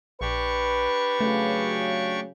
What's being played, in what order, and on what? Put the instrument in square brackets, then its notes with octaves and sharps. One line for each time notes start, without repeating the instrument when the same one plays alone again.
[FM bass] A#1 [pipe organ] D4 G4 C#6 [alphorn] B4
[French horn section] C#3 F#3 [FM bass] A3